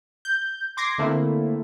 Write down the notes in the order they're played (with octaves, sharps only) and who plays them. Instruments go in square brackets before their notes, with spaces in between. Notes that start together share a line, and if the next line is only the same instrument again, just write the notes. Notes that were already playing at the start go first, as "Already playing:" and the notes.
[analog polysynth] G6
C6 D6 G#6 A#6 C7
D3 A3 A#3 C4 E4